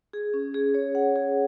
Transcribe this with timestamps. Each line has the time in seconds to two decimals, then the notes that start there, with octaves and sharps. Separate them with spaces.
0.13 G#4
0.34 C#4
0.54 G#4
0.74 C#5
0.95 F#5
1.16 G#4